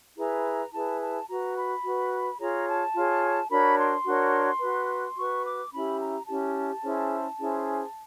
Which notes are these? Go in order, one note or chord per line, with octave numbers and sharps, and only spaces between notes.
E4 G#4 B4 A#5
E4 G#4 B4 A5
A5
F#4 B4 A#5
B5
F#4 B4
F4 G#4 C#5 A#5
A5
F4 G#4 C#5
D4 F#4 A#4 C#5 B5
C6
D4 F#4 A#4 C#5
F#4 B4
F#4 B4 C#6
D6
C#4 E4 G4 B5
A#5
C#4 E4 G4 A5
C#4 E4 G#4 C5
C#4 E4 G#4 C5